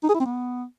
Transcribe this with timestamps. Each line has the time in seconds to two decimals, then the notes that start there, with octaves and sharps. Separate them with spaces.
0.04 D#4
0.09 G#4
0.15 E4
0.20 C4
0.26 B3